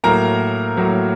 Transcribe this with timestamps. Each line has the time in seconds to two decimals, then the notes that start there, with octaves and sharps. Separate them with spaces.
0.04 A2 F#3 A#3 A#4 A#5
0.77 A2 F#3 A#3